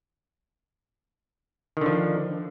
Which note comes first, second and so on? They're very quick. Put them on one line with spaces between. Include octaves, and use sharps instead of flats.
D#3 D3 F3